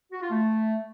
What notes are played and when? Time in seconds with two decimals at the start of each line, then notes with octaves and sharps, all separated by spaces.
0.12 F#4
0.21 F4
0.31 A3